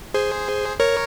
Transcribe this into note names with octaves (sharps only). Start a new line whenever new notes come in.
G#4 C5
A#4 C#5